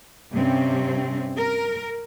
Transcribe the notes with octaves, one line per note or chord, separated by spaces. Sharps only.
G2 C3 C4 C#4
A#4